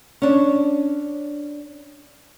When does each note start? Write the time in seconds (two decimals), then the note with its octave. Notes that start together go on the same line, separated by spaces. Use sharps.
0.22 C#4 D4